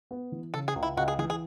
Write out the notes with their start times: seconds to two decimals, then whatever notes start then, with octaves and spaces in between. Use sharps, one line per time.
0.11 B3
0.32 E3
0.54 C#3 A4
0.68 G#4
0.76 C#2
0.83 E4
0.97 C#2 F#4
1.08 G#4
1.19 E3 G#4
1.30 G#4